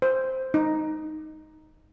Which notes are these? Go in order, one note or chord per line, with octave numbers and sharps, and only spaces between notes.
C5
D#4